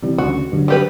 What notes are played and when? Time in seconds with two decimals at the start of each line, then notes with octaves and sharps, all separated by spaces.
0.02 C3 E3 G3
0.18 D2 C#3 F#4
0.52 G2 D3 F#3
0.68 G3 G4 B4